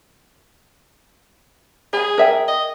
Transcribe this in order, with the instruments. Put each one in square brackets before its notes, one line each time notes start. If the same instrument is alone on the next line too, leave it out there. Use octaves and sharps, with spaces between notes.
[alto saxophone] G#4 [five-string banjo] G#5 B5
[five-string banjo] A#4 E5 G5
[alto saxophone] D#5